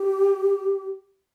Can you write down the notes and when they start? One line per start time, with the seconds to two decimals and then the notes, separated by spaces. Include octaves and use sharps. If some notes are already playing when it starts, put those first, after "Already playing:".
Already playing: G4